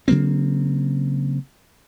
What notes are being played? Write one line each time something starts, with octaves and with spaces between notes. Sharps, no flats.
C#3 F#3 A#3 C4